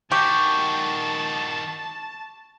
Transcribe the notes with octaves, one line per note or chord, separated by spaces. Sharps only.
D#3 F#4 G4 A5 C#6